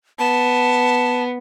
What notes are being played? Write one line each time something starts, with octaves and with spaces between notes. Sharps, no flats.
B3 A5